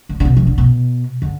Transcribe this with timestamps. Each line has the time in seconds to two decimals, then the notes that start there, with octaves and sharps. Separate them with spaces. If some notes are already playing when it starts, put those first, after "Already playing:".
0.09 D3
0.20 D3
0.25 B2
0.37 E3
0.47 D3
0.58 B2
1.22 D3